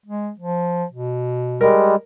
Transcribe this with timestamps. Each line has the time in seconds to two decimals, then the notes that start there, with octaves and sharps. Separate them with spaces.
0.06 G#3
0.39 F3
0.92 B2
1.61 G3 G#3 A#4